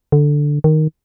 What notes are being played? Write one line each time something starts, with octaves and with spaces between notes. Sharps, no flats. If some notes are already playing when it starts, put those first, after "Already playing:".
D3
D#3